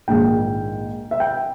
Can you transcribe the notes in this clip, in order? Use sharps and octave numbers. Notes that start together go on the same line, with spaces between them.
A#1 G#2 D#3 G5
E5
G5